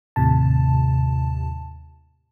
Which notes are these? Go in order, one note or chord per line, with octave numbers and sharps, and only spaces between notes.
D#2 A2 C3 A5